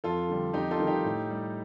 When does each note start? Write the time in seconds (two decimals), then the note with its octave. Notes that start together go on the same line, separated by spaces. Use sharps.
0.04 F2 F4 A4
0.29 D3 G3
0.53 F2 D#4 G4
0.71 F4 A4
0.79 D#3 G3
0.87 D#4 G4
1.04 A2
1.30 G3